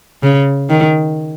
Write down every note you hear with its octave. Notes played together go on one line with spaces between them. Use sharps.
C#3
D#3